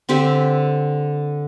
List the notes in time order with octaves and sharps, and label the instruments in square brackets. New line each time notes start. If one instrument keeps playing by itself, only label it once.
[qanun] D3 C4 G4 E5